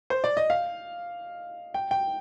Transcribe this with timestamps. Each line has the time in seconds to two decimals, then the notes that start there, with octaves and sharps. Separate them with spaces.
0.10 C5
0.24 D5
0.37 D#5
0.50 F5
1.74 G5
1.91 G5